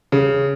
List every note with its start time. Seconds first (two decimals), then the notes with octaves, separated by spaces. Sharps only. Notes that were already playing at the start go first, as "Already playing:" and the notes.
0.12 C#3